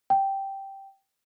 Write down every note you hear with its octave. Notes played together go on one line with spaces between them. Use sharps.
G5